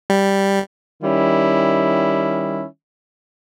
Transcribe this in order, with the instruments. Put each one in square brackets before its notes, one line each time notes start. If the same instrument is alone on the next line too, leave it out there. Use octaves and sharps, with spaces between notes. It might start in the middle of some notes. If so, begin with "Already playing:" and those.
[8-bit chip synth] G3
[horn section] D#3 G3 C#4 E4